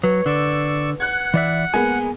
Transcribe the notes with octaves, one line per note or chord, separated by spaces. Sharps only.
F#3 B4 C#5
D3 D5 C#6 E6
F#5 F#6 G#6
E3 D5 E5
G#3 A#3 B3 G#5